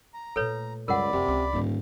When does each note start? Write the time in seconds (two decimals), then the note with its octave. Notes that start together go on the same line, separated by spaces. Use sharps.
0.14 A#5
0.36 A#2 A3 A4 B4 C#5
0.88 C#2 F#2 G3 A#4 D5 F#5 B5
1.13 F2 C3 A#3
1.28 C#2
1.53 D#1 G#2 D3